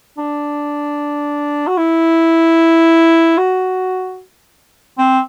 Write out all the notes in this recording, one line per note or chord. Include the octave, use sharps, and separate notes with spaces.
D4
F#4
E4
F#4
C4